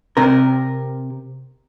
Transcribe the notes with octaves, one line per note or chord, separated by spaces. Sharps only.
C3 A#4